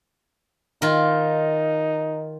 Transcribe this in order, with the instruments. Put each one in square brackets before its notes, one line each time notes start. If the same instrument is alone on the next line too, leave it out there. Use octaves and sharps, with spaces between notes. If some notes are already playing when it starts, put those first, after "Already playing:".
[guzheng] D#3 F4 [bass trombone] D#4